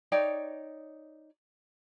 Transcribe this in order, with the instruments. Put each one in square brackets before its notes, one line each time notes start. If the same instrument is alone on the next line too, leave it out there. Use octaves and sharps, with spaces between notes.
[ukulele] D#4 C#5 D5 G5